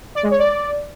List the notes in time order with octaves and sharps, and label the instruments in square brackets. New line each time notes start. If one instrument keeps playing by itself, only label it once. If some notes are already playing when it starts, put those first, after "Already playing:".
[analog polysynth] D5
G#3
C#5
D5